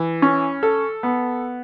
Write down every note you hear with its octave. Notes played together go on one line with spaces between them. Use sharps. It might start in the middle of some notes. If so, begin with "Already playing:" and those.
Already playing: E3
C#4
A4
B3